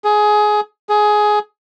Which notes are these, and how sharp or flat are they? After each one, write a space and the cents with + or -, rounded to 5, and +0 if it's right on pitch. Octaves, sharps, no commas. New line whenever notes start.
G#4 +15
G#4 +15